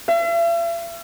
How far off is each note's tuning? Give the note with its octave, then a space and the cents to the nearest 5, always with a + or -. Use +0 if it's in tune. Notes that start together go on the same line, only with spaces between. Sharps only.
E5 +45